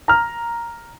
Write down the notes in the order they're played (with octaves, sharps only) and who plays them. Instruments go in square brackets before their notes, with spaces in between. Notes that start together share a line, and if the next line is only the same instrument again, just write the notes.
[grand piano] A#5 F6